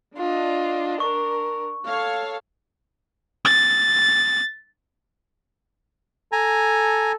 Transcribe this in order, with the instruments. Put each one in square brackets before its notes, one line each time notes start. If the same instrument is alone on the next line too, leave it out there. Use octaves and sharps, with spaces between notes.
[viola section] D4 [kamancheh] F4 D#5
[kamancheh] A#4 [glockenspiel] C#6
[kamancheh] A4 [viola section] C#5 F5
[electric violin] A6
[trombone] A4 [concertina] G#5 A#5